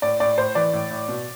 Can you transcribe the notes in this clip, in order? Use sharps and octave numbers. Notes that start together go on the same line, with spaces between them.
A2 D5
A2 D5
A2 C5
E3 D5
A2
A2
B2